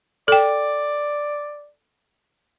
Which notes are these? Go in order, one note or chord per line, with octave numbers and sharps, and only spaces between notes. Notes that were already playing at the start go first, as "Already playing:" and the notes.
A4 D5 G5